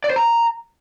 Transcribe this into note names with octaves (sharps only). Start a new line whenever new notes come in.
D5
C5
A#5